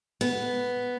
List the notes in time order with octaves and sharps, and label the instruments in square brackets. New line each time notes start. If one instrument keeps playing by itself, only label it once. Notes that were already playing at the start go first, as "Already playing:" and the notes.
[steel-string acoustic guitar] B3